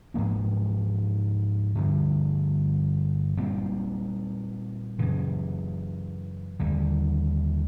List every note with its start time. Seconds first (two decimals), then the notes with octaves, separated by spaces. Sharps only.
0.14 G#2 F3 A#3 D4
1.75 G2 D3 F3
3.37 A#2 G3 C4
4.99 F#2 C#3 E3
6.60 D#2 D3 G3